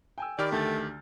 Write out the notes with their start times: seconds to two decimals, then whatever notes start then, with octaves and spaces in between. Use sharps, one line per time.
0.18 G5 G#5 E6
0.39 D#3 G4 D5 B5 F6
0.52 D2 A3 G6 A6